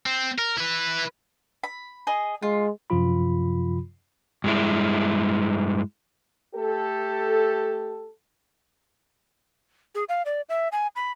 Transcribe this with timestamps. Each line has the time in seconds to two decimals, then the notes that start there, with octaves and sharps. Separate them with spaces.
0.06 C4
0.38 A#4
0.57 E4 B4
1.64 B5
2.07 G#4 D#5
2.42 G#3 F4
2.90 F#2 C3 F3 F4 B5
4.44 G2 G#3 E4
6.55 A3 G4 A4
9.95 G#4
10.09 F5
10.26 D5
10.49 E5
10.72 G#5
10.96 B5